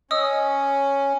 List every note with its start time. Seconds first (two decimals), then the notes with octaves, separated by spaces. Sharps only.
0.11 C#4 D#5 D#6 E6